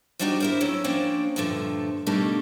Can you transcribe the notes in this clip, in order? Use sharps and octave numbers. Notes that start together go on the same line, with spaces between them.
F3 G3 D4 D#4 F#4 G4
E4 A#4 C5
F#3 A3 C#4 E4
F3 A#3 C#4 D4 C5 G5
G2 A#2 D3 F3 A3
B2 D3 D#3 G3 A3 A#3